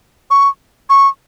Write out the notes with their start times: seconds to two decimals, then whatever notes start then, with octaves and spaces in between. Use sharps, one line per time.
0.31 C#6
0.90 C#6